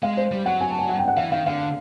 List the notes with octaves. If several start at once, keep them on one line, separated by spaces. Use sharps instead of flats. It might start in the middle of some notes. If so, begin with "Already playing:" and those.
G#3 F5
C5
G3
F#3 F#5
G#5
A5
G#5
F#5
G5
F#5
E3 F5
D#3 F5
D3 F5